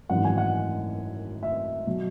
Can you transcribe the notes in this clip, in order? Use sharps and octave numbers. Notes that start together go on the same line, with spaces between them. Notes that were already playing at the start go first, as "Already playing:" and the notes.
G#1 F#2 E3 F#5
G#5
F#5
E5
B2 F#3